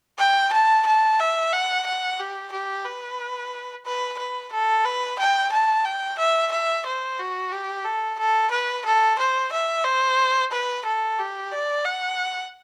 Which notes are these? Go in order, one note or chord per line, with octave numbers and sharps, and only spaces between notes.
G5
A5
A5
E5
F#5
F#5
G4
G4
B4
B4
B4
A4
B4
G5
A5
G5
E5
E5
C5
F#4
G4
A4
A4
B4
A4
C5
E5
C5
B4
A4
G4
D5
F#5